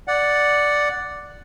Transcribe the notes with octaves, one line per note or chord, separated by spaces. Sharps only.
D5 F#5